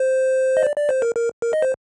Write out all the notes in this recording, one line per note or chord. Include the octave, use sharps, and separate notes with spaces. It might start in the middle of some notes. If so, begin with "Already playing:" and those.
Already playing: C5
D#5
D5
D5
C5
A#4
A#4
A#4
D#5
C5